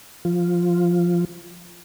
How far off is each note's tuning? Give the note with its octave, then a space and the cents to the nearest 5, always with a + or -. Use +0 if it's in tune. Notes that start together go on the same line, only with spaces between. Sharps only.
F3 +0 F4 +0